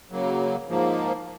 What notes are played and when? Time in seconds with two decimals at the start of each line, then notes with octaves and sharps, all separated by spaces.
0.11 C#3 F#3 A#3
0.67 G#2 F3 A#3